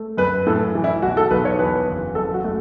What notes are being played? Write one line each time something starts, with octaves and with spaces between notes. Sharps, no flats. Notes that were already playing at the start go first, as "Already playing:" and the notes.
Already playing: A3
F#2 B4
A2 A4
E3
E4
B1 F#4
A4
B1 B4
C#5
E2 B4
F#1
F#2 A4
F#4
A3